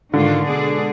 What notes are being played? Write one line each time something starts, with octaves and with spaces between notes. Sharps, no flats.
G#2 D3 D#3 G#3 D4 F4
B2 G#3 D4 G#4 D5